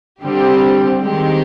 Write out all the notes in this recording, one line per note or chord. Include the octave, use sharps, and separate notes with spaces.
D3 G3 C4 G4
D#3 G#3 C4 G4